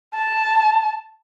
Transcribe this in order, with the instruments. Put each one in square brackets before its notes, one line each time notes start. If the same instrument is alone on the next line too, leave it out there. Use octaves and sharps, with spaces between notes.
[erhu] A5